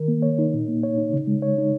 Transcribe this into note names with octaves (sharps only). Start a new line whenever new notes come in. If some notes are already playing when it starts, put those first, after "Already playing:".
Already playing: D#3 A#4
A#3
C#5
D#4
A#2
A#3
C#5
D#4
C#3
G#3
C#5
D#4